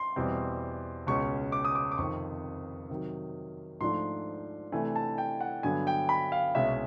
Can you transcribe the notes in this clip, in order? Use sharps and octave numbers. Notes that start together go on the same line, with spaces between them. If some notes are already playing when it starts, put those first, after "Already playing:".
Already playing: C6
E2 B2 G3 C4
C#2 B2 G#3 C#4 C#6
D6
D#6
D6
D6
F2 C3 D#3 C#6
C3 D#3 F#3
G#2 F3 A3 D4 C6
C3 E3 A3 D4 G#5
A5
G5
F#5
G2 D3 F#3 B3 G#5
G5
B5
F5
C2 B2 G#3 C#4 E5